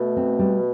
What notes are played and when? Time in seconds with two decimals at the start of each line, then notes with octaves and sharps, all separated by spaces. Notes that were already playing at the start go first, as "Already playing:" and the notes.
Already playing: B2 A3
0.17 C4
0.39 G3